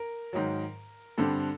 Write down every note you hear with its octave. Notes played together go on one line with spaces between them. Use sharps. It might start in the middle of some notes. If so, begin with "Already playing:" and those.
Already playing: A#4
G#2 D#3 F#3
G2 D3 G3 C4 A4